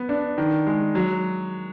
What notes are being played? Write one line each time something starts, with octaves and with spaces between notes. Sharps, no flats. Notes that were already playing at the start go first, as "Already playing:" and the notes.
Already playing: B3
D4
D#3
G#3
F#3